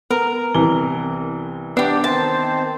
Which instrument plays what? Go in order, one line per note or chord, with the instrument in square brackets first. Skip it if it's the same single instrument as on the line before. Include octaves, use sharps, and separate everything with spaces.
[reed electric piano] B3 [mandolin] A#4
[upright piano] C2 E3 G7
[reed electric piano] B3 [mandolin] D4 G4
[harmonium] D#3 C4 C5 [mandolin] A5